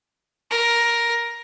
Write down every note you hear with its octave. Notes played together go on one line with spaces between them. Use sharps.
A#4